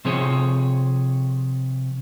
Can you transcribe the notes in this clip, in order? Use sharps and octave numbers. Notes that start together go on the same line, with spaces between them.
C3 F3 C4 G#4 C#5